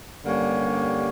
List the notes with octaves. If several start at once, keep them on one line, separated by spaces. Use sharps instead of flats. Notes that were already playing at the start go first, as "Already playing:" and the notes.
G2 D3 G3 A#3 C#4